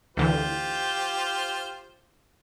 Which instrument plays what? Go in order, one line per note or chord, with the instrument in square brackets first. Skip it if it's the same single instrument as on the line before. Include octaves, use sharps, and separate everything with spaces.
[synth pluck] D2 D3 E3 [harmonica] F4 G4 C5